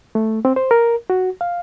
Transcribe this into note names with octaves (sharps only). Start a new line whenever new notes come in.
A3
C4
C5
A#4
F#4
F5